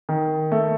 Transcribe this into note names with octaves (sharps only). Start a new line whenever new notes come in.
D#3
A3